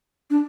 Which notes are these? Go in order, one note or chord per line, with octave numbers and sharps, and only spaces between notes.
D4